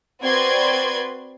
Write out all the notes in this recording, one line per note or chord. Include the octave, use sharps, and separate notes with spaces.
C4 F#4 B4 D5 C6 G#6